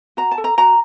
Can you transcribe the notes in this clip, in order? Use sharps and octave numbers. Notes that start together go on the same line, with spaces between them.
F#4 A#5
A5
A4
A#5
F#4 A#5